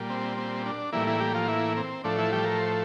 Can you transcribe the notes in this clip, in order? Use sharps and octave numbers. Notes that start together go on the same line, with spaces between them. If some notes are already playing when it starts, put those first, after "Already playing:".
Already playing: A#2 G3
C4
C4
D4
A2 E3 G3 A#3 E4
E3 E4
G3 G4
F3 F4
E3 E4
C4
A2 F3 A3 D4
E3 E4
G3 G4
A#4
C5